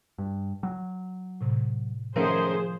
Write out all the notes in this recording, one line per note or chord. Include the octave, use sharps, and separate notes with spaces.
G2
F#3
A2 C3
F#2 D#3 F3 A3 G#4 C5